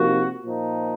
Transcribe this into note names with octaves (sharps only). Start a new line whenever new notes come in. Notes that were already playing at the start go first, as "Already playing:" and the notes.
Already playing: C3 F3 A#3 D#4 F#4
A#2 F3 A#3 D#4